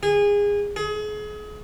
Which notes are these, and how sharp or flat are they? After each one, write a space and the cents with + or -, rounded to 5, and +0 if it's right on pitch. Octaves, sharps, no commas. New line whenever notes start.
G#4 -25
G#4 +30